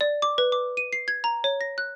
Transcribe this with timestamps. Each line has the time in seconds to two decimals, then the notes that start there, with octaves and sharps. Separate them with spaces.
0.01 D5
0.22 D6
0.38 B4
0.52 D6
0.77 D#7
0.93 C7
1.08 G#6
1.24 A#5
1.44 C#5
1.61 A#6
1.78 F#6